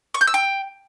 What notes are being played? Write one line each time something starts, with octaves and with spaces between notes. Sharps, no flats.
C#6
G6
E6
G5